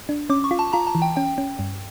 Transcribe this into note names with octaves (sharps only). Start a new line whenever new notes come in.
D4
C#4 D6
C#6
F4
A5
F4 A#5
A5
E3
G5
C#4 G5
C#4
G2